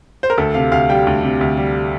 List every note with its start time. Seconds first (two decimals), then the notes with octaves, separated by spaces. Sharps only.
0.23 C5
0.30 A#4
0.38 D2 A4
0.54 C3 F5
0.72 D2 F5
0.89 G3 G5
1.07 D2
1.23 C3
1.41 D2
1.57 G3